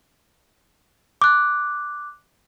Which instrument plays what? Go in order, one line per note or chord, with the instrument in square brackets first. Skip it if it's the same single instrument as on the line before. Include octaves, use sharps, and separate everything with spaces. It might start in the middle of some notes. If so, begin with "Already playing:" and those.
[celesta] D6 F#6